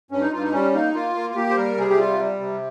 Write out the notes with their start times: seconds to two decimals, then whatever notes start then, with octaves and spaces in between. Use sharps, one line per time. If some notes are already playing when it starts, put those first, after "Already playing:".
0.11 G2 C#4
0.21 D#4
0.31 G2 F4
0.42 D#4
0.52 G3 C#4
0.73 A#3 D#4
0.94 A#3 F4
1.15 A#3
1.30 F4
1.35 A#3 G4
1.50 C5
1.57 G3 A#4
1.77 C3 G#4
1.90 G4
1.98 G3 F4
2.19 G3
2.40 C3